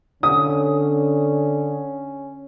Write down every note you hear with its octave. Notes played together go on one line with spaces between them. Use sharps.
D3 C#4 D#6